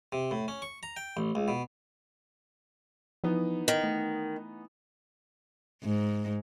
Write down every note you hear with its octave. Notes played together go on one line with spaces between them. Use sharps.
C3
A2
C#4
C#6
A#5
G5
A1
C#2
B2
E3 F3 B3 D#4
D#3
A3
G#2